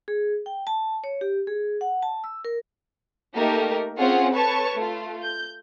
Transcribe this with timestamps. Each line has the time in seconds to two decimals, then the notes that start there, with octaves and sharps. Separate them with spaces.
0.08 G#4
0.46 G5
0.67 A5
1.04 C#5
1.21 G4
1.47 G#4
1.81 F#5
2.02 A5
2.24 E6
2.45 A#4
3.35 A3 A#3 D#4 G4 A4 A#4
3.98 C4 C#4 F4 G#4 C#5 F#5
4.33 A4 B4 C#5 A5 C#6
4.74 A3 F4
5.22 G6